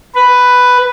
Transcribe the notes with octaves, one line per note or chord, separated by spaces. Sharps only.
B4